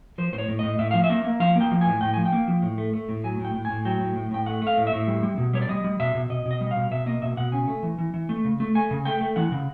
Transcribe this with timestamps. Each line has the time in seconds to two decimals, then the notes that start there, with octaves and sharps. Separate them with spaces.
0.18 F3 C5
0.33 A2 C5
0.38 C#5
0.48 A2
0.59 A2 D#5
0.79 A2 E5
0.91 F3 F5
1.04 E5
1.10 A#3
1.25 A#3
1.40 F3 F5
1.56 A#3
1.61 G5
1.71 F3
1.81 G#5
1.86 A2
2.01 A2 G5
2.14 F3 G#5
2.25 G5
2.32 A#3
2.48 F3
2.62 A2
2.78 A3
2.93 A3
3.09 A2
3.24 F#3 G#5
3.39 A2
3.45 G5
3.55 A2
3.65 A2 G#5
3.85 F#3 G5
4.00 A2
4.16 A2
4.31 A2 G5
4.46 A3 F#5
4.62 A3
4.67 F5
4.77 A2
4.87 E5
4.92 A2
5.08 G3
5.23 G3
5.38 B2
5.53 G3 C#5
5.62 D5
5.69 G3 D#5
5.84 G3
6.00 B2 E5
6.15 B2
6.30 B2 D#5
6.46 B2
6.51 D#5
6.61 G3
6.71 B2 F5
6.91 B2 E5
7.06 A#3 D#5
7.22 B2 E5
7.37 B2 F#5
7.52 C#3 G#5
7.68 A3
7.83 E3
7.98 E3
8.14 E3
8.29 A3
8.45 C#3
8.60 A3
8.75 A3 G#5
8.91 C#3
9.05 A3 G5
9.21 A3
9.36 E3 F#5
9.52 C#3